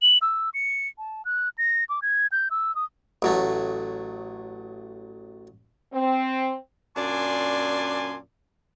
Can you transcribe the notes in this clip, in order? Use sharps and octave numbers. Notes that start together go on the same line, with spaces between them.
F#7
E6
C#7
A5
F#6
A#6
D6
G#6
G6
E6
D#6
A1 F#3 A3
C4
F#2 A#2 D4 D5 G#5 C6